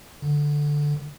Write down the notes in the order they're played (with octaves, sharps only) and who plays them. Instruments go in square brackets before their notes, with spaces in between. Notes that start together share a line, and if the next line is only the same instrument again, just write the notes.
[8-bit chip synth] D3